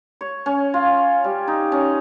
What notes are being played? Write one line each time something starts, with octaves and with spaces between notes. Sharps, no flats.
C#5
C#4
F4
G3
D#4
C#4